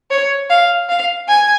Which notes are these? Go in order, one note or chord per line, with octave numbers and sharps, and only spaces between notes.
C#5
F5
F5
G#5